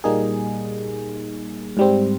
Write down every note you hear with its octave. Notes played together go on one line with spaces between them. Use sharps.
A#2 G3 A#3 D#4 G#4
G#2 G3 C4